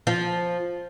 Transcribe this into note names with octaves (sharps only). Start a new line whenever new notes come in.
F3